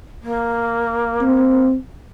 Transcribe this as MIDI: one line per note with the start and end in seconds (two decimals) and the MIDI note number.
0.23 1.66 58
1.22 1.76 60